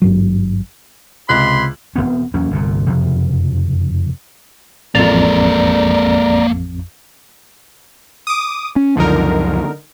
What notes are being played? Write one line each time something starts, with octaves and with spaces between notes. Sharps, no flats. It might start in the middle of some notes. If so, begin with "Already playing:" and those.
G#1 G2 F#3
C#2 C3 B5 C6 F#6
E1 A2 B3 C4
E2 F#3 A#3 C#4
G1 C2 A#2
F#1 F2 C3 F3
A1 F2 G#3 A#3 D5 A#5
D6 D#6
C#4
C#2 F#2 D3 F3 D#4 A#4